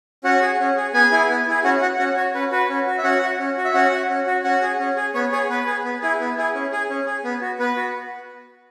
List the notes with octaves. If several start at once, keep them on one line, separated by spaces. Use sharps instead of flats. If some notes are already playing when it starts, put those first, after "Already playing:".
C#4 F#4 F#5
G#4
C#4
G#4
B3 G#4 G#5
E4 G#4
B3
E4 G#4
C#4 F#4 F#5
F#4 F#5
C#4 F#4 F#5
F#4 C#5
C#4 B4
F#4 B4
C#4
F#4
E5
C#4 F#4 F#5
F#4
C#4
F#4
E5
C#4 F#4 F#5
F#4
C#4
F#4
C#4 F#4 F#5
G#4
C#4
G#4
B3 C#5
G#4 C#5
B3 B4
G#4
B3
E4 G#4
B3
E4 G#4
C#4
G#4
C#4
G#4
B3
F#4
B3 B4
F#4